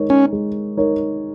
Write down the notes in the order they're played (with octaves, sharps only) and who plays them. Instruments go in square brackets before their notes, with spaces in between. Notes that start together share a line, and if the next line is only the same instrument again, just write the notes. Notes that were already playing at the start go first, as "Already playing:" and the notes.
Already playing: [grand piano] G#3 D#4 A#4 C#5
[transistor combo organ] C#4
[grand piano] G#3
D#4 A#4 C#5